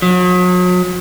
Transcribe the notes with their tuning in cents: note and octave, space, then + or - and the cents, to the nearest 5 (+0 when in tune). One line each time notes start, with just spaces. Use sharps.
F#3 -40